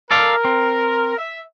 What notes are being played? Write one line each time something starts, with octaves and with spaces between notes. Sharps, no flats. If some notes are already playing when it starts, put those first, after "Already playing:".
A4 A#4 D5 F5
C4
E5